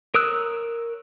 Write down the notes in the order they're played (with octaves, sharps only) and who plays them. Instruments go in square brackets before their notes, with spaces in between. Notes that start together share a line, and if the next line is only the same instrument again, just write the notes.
[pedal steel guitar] A#4 C#5 D#6 E6 F#6